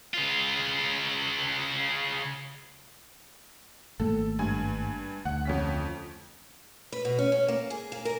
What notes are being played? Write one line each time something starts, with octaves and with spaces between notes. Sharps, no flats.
C#3 F4
G#1 A3 A#3 A4
G2 G#5
D2 F#5
F2 C#4 B6
B4
B2
C#4
C#4
A#3
G#4
A#3
A#4